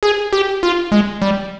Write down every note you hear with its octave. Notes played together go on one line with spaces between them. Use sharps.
G#4
G4
F4
G#3
G3